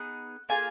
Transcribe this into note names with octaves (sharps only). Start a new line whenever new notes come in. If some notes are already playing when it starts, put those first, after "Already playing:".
Already playing: B3 D#4 G#4 F#5
A#3 F4 G#4 G#5